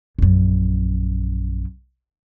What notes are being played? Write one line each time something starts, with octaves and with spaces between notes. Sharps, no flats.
A#1 F#2